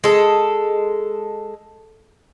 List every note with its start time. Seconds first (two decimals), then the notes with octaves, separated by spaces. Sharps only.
0.04 G#3 A4